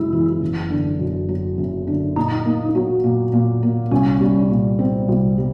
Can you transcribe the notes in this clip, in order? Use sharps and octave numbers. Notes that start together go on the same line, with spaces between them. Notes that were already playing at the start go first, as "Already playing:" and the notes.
Already playing: F#2 C#3 G#3 E4
E3
F#1
D3
F#2
F#3
F#1
D3
A#2 D#4
A#3
F#3
A#2
A#2
A#3
C2 C#4
G3
A#2
C4
C2
G3